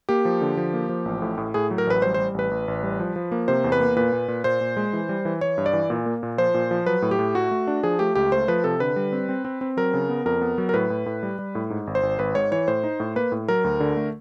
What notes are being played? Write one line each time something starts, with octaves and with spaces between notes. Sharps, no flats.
A#3 G4
F3
D3
F3
A#3
F3
A1
A2
A2
A2 G#4
F#3
A#4
A1 B4
G3 C5
G3 C5
A1 B4
A1
A1
G3
F3
F3
A#3
C3 C5
E2
B4
A#3
A#2 B4
A#2
A#2
A#2 C5
A#2
G#3
E3
G3
E3
E3 C#5
G2
D5
E3
A#2
A#3
A#2
F3 C5
A#2
F3
F#3 B4
A2
G4
A2
A3 F#4
A3
D4
F3 G#4
A3 G4
C#2 G4
A3 C5
F3 B4
C3 A4
D3 B4
G3
C4
C4
C4
C4
F#3 A#4
C#3
B3
F2 A#4
B3
F#3
A#4
A2 B4
A2
A2
G3
G3
A2
G#2
G#1
C5
G#1
G#1 B4
G#2 C#5
E3 C#5
A2 C5
D#4
A2
A#3 B4
A2
F#3 A#4
D2
D3
A3